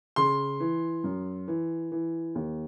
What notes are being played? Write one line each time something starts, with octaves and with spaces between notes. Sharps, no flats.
C#3 C6
E3
F#2
E3
E3
D#2